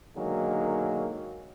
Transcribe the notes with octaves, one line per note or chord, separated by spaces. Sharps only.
B2 D3 D#3 F#3 G#3 A#3